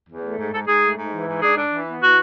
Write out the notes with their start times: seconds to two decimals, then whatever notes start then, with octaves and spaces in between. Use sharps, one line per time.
0.09 E2
0.23 A3
0.38 G#2
0.53 G#2 A4
0.68 G#2 G#4
0.83 A3
0.98 G#2
1.12 E3
1.27 G#2
1.42 D4 G#4
1.57 D4
1.72 E3
1.87 B3
2.01 E3 F#4